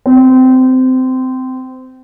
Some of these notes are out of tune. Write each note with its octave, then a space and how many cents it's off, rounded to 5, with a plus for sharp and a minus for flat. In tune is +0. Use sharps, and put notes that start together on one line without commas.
C4 -20